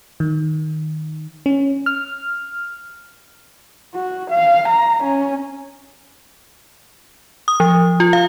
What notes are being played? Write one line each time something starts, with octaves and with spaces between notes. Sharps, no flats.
D#3
C#4
F6
F#4
F5
A#5
C#4
D#6
F3
F4
F5